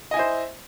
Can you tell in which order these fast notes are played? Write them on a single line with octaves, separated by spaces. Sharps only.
D#5 G#5 E4 C5